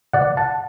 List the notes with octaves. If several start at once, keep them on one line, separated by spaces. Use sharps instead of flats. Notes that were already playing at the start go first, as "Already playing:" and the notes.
D5 F#5
F#5 A5